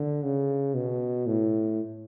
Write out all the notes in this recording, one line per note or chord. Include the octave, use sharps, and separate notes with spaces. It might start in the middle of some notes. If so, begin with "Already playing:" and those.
Already playing: D3
C#3
B2
A2